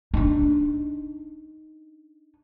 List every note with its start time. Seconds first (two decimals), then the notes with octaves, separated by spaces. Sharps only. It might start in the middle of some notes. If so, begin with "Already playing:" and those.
0.14 D4 D#4